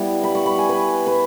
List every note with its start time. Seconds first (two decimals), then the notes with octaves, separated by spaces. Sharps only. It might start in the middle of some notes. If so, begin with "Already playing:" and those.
Already playing: G3 B3 E4
0.23 B5
0.35 C#6
0.46 B5
0.58 G#5
0.69 B4
1.07 B4